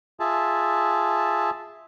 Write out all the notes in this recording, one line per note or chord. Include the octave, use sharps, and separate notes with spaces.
F4 G#4 E5 A5